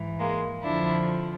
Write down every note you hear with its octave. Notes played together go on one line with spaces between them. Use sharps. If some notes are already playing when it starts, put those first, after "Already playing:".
Already playing: G#2 E3
G#3 A#3
F2 D3 F3 D4 E4